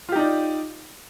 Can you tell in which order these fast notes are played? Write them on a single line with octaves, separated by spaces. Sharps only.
F4 G4 D#4 D5